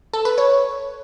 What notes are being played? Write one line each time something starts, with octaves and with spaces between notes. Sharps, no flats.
A4
B4
C#5